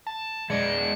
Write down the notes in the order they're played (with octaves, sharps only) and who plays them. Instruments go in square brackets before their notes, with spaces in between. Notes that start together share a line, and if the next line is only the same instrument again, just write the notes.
[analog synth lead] A5
[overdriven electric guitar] G#3 D4 [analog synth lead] C#7